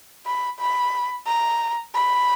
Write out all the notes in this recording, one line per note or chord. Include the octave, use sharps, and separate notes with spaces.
B5
B5
A#5
B5